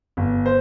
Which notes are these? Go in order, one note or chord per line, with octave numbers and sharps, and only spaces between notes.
G1
C5